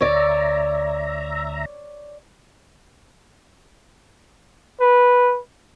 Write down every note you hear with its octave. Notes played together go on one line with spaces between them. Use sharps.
D2 C#5 D5 E5 A#5
B4